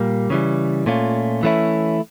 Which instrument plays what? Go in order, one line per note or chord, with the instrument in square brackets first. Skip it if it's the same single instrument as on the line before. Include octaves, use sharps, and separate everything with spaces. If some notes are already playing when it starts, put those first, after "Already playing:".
Already playing: [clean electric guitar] A#2 G3 A#3
C#3 E3 G3
A#2 A3 C#4 F4
E3 A3 C#4 E4